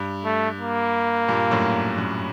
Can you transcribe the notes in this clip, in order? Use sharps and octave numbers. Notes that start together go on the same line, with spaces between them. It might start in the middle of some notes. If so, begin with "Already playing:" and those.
Already playing: G2
A3
A#3
G2 A#2
F#2 A2
F#2